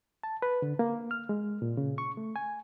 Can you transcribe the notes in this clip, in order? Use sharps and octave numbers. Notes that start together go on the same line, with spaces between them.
A5
B4
D3
A#3
F6
G#3
A#2
C#3
C#6
A3
G#5